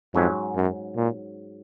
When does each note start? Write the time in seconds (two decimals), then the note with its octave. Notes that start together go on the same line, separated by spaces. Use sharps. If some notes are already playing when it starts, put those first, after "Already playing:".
0.14 F2 G#2 F#3 C#4
0.56 F#2
0.97 A#2